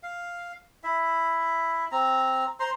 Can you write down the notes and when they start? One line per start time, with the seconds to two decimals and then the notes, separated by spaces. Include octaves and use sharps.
0.03 F5
0.84 E4 E5
1.92 C4 A#5
2.60 C5 A#5 C6